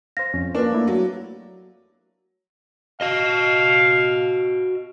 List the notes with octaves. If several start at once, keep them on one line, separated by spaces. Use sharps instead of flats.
C5 F5 A#6
F2 C#4
A#3 C#4 D4 F4 A#4 B4
A3 E4
F#3
F#4 D#5 F5